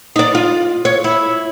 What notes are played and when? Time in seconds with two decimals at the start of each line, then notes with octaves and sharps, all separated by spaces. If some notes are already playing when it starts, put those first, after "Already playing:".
0.16 D#4 D5
0.35 F4
0.85 C#5
1.04 E4